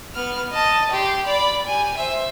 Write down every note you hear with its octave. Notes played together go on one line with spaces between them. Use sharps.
B3 F6
D#5 A5
G4 C6
D5 B5
G4 G#5
C5 E5